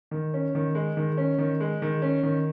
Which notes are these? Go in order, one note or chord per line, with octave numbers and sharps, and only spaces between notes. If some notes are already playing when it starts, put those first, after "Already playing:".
D#3
C#4
D#3
G#3
D#3
C#4
D#3
G#3
D#3
C#4
D#3